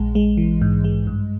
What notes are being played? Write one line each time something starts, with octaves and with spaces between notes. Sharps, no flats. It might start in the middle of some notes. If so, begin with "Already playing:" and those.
Already playing: A#1 G#3
G#3
E3
G#2
G#3
G2